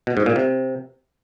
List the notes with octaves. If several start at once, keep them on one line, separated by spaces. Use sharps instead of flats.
B2
G#2
A#2
C3